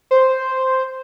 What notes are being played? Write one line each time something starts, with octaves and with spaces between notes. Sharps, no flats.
C5